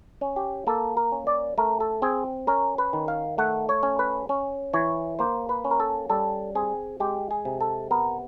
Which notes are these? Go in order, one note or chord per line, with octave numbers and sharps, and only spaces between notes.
C#4
G4
A#3 A4
A#4
C#4
D5
A3 A#4
A4
C4 G#4
C#4 A#4
B4
D#3
F5
A3 F#5
C#5
C#4
B4
C#4
E3 C#5
A#3 C5
B4
C#4
A#4
A4
G3 A4
C4 G#4
G#3 G4
G#4
C3
A4
B3 A#4